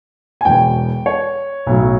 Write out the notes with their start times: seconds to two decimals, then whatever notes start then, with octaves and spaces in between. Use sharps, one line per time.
0.41 G#5
0.45 E1 E2 B2 G5
1.06 C#5
1.66 B1 A2 F#3